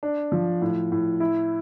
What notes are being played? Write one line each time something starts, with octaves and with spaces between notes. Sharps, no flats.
D4
F3
A2
A2
E4